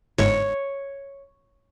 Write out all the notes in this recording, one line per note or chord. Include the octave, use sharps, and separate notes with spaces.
G1 G#2 C#5